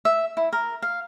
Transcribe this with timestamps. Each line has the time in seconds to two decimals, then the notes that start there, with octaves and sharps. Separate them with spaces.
0.05 E5
0.37 E4
0.53 A#4
0.82 F5